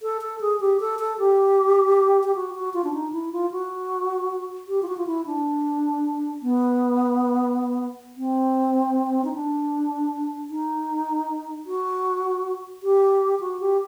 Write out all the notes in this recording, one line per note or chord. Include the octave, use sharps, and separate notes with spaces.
A4
A4
G#4
G4
A4
A4
G4
G4
F#4
F#4
F4
D4
D#4
E4
F4
F#4
G4
F4
F#4
F4
E4
D4
B3
C4
D#4
D4
D#4
F#4
G4
F#4
G4